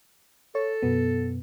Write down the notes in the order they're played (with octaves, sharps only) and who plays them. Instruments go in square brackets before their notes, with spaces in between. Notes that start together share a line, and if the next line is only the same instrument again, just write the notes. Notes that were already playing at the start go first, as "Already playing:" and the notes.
[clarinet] A4 [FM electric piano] C#5
[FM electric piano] F#2 B2 B3